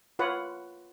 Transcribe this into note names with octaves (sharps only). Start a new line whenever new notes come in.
F4 B4 C#5 F#5